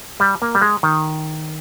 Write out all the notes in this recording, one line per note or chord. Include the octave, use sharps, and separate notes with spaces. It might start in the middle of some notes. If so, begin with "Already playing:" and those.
G3
A#3
G3
G#3
D#3